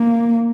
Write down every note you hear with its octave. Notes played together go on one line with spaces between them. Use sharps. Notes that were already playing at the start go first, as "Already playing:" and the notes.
Already playing: A#3